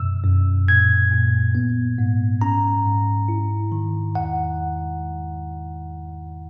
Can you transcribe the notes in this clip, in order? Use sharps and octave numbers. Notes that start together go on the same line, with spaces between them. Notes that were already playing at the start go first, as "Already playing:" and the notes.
Already playing: F#2 B2 E6
F#2
A#2 G#6
A#2
B3
G#2
C#4 A#5
G#2
E4
D#3
E2 F#5